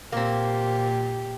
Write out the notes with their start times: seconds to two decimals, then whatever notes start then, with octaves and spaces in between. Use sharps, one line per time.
0.12 A#2 A#3 C4 G4